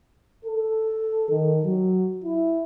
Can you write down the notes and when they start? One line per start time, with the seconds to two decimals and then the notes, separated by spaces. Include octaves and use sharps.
0.45 A4
1.29 D#3
1.65 F#3
2.25 E4